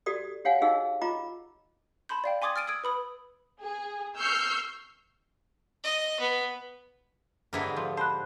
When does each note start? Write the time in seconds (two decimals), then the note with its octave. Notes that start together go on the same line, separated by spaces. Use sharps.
0.06 F#4 G4 A4 D5 D#6
0.45 G4 C#5 F5 F#5 G#5
0.61 D#4 F#4 G#4 D#5 F5 E6
1.01 F4 D#5 A#5 D6
2.09 A5 B5 C6 G6
2.24 D5 F5 G5
2.42 G#5 C6 D6 D#6 G#6 A6
2.56 F6 A6 D7 D#7
2.67 D#6 E6 G#6 D7
2.84 B4 B5 D#6
3.61 G#4
4.18 C#6 E6 F6 G6 C7
5.84 D#5
6.20 B3
7.53 G#2 D3 B3 E4 G4 A#4
7.76 F3
7.97 C5 A5 B5 F#6